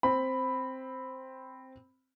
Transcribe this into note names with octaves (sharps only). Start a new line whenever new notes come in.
C4 B5